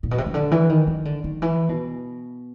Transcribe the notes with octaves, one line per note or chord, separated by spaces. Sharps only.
A#2
B2
C3
C#3
D3
E3
D#3
D#3
D3
D#3
E3
B2